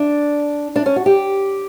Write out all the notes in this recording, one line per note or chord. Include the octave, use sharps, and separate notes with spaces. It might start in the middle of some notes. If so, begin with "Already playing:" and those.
Already playing: D4
D4
C#4
F#4
G4